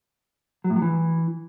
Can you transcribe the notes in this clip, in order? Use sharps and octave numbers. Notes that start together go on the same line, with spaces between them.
F#3
A2
F#3
E3